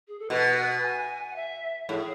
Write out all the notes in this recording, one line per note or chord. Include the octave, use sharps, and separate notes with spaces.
G#4
A4
B2 B4
G#5
F#5
E5
A2 G#4